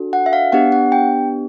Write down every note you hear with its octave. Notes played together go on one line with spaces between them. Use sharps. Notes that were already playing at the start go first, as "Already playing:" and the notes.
Already playing: D4 F#4 A4
F#5
E5
F5
B3 D4 G4 F#5
F#5
G5